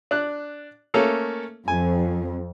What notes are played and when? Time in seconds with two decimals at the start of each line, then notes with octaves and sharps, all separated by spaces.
0.11 D4 F#6
0.94 A3 A#3 C#4
1.68 F2 G#5